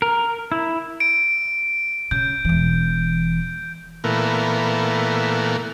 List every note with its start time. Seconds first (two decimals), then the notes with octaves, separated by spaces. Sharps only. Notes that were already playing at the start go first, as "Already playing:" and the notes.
0.02 A#4
0.52 E4
1.00 D7
2.11 C#3 G6
2.45 E1 E3
4.04 A#2 E3 A3 B3 A#4